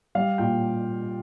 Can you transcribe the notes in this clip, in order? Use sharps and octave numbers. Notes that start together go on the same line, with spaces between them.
G3 F5
A#2 G5